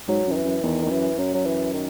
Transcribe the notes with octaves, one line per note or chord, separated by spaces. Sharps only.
G#2 F#3
F#2 D#3
E3
F#2
E2 D#3
D#3
E2
F#2 E3
F#2 F#3
F#3
E3
D#3